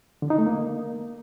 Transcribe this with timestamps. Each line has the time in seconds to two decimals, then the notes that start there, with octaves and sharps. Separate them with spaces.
0.22 D3
0.30 D#4
0.38 A3
0.46 A#3